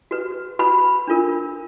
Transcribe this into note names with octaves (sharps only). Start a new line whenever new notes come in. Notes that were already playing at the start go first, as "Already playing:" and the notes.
F#4 B4
F#4 B4 B5
D4 F4 A#4